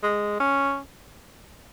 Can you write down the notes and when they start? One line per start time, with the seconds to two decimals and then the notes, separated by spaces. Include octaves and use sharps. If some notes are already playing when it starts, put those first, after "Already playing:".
0.03 G#3
0.40 C#4